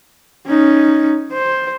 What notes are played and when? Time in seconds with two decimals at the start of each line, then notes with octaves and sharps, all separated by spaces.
0.47 C#4 D#4
1.33 C5